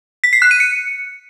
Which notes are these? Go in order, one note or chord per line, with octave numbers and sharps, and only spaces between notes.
B6
C7
F#6
D#7
C#7